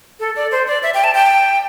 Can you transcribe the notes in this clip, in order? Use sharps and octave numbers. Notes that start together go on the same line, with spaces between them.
A4
D5
C5
D5
E5
G5
A5
G5